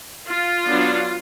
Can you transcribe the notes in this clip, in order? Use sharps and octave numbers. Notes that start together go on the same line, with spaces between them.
F4
F#3 B3 D4